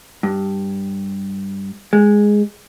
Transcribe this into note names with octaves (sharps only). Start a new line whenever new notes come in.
G2
G#3